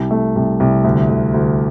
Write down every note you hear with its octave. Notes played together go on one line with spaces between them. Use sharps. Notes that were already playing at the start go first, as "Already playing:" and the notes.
Already playing: C2
A3
C2
C2
D2
D2
D2